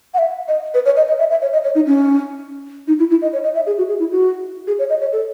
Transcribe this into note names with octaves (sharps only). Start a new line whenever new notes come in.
F#5
E5
D#5
B4
C#5
D#5
D#5
E5
E5
C#5
D#5
C#5
D#4
C#4
D#4
E4
E4
D#5
C#5
D#5
E5
G#4
F#4
G#4
E4
F#4
G#4
C#5
D#5
C#5
A4